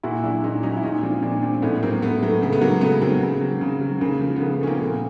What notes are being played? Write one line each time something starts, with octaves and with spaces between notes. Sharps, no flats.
A#2 E4 F#4
F#3 D4 E4
A#2 C#4 D#4
F#3 C#4 D#4
E4
A#2 C#4 D#4
D#4
F3 C4 D4
A#2 C4 D4
F3 C4 D4
C4
A2 B3 C#4
F#3 A#3 C4
A2 A3 B3
F#3 A3
C#3 A3
B3
F#3 A#3
C#3 A3 B3
F#3 A#3 C4
C#3
F#3
C#3
F#3
C#3 A#3
F3
B3
C#3 A#3
A3 B3
F3 C#4
A#3 C4
A#2 A3 B3